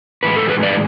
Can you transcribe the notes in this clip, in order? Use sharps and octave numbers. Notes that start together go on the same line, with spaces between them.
A2 E3 G#3 B4
A4
G#4 B4
B4 D5